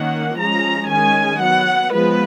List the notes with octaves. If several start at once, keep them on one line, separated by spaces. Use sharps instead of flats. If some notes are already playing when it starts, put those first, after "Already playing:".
Already playing: D#3 A#3 C#4 F#5
F3 G#3 C#4 A#5
D#3 G#3 C#4 G#5
F#3 B3 F#5
F3 G#3 B3 B4